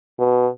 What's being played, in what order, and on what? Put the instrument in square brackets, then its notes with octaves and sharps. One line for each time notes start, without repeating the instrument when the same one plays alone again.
[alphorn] B2